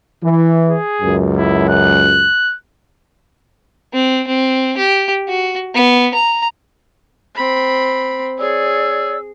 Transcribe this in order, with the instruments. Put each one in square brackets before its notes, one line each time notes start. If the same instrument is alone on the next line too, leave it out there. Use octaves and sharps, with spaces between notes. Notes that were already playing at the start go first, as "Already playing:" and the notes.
[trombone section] E3
[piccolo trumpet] G#4
[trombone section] C#2 F#2
[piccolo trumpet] E4
F#6
[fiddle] C4
C4
G4
F#4
B3
A#5
[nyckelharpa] C4 B5
[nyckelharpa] G#4 [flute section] C#5 D5 E6